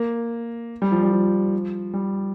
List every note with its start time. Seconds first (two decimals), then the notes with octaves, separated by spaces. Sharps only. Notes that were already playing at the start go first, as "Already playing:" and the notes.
Already playing: A#3
0.82 G3
0.92 F3
1.03 G3
1.12 F3
1.94 G3